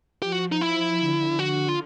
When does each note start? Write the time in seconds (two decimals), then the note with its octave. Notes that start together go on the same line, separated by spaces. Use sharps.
0.22 F3 G4
0.32 F#4
0.52 D#4
0.61 E4
1.00 D3
1.39 F#4
1.68 F4